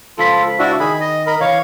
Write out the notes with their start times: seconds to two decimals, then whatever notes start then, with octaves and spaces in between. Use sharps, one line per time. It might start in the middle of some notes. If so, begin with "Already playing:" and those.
0.18 C#2 F3 F4 A4 B5
0.59 D4 E4 F#4
0.80 D#3 G#4 B5
1.01 D#5
1.27 A#4 D#5 B5
1.41 E3 C#5 F5